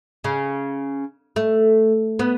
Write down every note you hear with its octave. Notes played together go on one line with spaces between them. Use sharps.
C#3
A3
B3